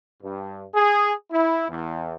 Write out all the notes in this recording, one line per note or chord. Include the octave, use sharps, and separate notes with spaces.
G2
G#4
E4
E2